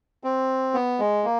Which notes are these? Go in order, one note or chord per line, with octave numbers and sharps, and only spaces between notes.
C4
B3
G#3
A#3